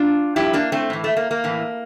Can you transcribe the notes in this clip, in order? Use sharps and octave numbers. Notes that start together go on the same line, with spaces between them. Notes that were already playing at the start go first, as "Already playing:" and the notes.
Already playing: D4 F4
G2 F3 E4 G4
A#3 D4
A3 C4
A2 E3
A3
A#3
A#3
A2 E3